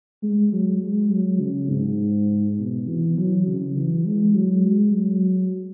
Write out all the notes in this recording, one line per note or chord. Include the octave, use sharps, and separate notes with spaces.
G#3
F#3
G#3
F#3
C#3
G#2
B2
E3
F#3
C#3
E3
G#3
F#3
G#3
F#3